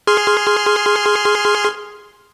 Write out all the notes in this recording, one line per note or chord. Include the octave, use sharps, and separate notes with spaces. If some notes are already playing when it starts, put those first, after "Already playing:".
G#4 C6 F6